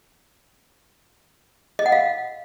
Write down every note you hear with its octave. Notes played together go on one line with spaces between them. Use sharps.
D#5
F#5
F5